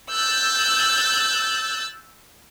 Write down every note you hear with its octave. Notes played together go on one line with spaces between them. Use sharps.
E6 F#6 G6 A6